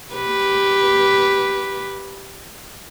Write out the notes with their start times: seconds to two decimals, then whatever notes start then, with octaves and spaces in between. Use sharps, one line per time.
0.14 G4 B4